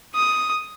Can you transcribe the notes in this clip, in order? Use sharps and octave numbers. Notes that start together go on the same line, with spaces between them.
D#6